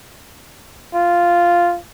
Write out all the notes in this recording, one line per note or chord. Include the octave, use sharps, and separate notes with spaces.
F4